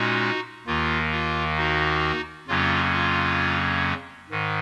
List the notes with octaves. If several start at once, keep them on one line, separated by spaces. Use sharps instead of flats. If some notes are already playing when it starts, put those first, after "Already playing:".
Already playing: A#2 G#3 C#4 D#4 F#4
D#2 D#3 A#3 F4
F4
D#4 F#4
F2 C#3 F#3 A#3 C#4 F4
F4
G#2 D#3